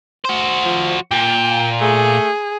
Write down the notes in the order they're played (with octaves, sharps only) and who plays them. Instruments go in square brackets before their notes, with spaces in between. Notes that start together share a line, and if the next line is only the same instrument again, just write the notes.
[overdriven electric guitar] F#4 C5
[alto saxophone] F3
[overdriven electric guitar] A#2 [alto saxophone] G5
[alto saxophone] A3 [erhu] G#4